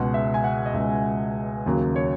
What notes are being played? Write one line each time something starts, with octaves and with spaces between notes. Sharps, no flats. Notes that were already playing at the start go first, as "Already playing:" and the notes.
Already playing: C#2 B2 G#3 F#5
E5
G#5
F#5
D#5
C#2 B2 G#3 E5
D#2 C#3 F#3 A#3
C#5